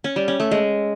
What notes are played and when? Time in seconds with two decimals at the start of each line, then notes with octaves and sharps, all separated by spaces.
0.04 C#4
0.16 G3
0.28 C#4
0.40 A3
0.51 G#3